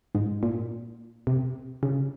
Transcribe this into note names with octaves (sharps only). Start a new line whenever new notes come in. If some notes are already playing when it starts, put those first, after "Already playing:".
G#2
A#2
C3
C#3